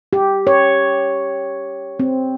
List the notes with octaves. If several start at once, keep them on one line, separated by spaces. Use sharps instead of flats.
G4
C#5
C4